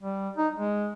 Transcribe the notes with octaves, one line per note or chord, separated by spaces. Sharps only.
G3
D#4
G#3